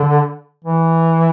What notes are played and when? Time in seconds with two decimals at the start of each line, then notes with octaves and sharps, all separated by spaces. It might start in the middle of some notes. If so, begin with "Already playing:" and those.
Already playing: D3
0.65 E3